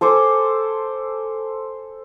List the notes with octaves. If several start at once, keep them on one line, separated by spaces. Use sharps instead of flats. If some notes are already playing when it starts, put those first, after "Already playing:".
A4 C5 G#5 D6